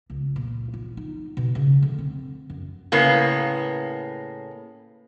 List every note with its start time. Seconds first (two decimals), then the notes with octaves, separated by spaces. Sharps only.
0.10 C#2
0.36 A#2
0.73 F4
0.97 D#4
1.37 B2
1.55 C#3
1.82 D3
1.98 C4
2.50 F#2
2.92 A2 C#3 A#3 B3